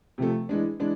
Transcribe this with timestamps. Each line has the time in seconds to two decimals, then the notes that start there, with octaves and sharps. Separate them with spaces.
0.18 C3 F3 A3
0.49 E3 G#3 D4
0.80 E3 G#3 D4